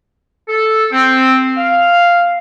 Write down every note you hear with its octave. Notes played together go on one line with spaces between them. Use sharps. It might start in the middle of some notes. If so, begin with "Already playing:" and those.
A4
C4
F5